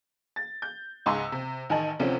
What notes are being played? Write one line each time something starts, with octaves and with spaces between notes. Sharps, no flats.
A6
G6
C#2 G#2 G#5 C6 E6
C3
A1 D#3 D#4 G#5 A5 F#7
D2 C3 F3 C4 C#4